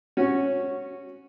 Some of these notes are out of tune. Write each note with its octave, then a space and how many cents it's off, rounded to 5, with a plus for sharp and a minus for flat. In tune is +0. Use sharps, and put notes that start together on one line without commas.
C#4 -10 F#4 +0